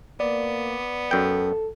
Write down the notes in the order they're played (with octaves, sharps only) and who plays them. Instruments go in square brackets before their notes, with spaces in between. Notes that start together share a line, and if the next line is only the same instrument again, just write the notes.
[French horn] A#3 [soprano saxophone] B3 [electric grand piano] D5
[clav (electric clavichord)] F#2 G5 [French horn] A4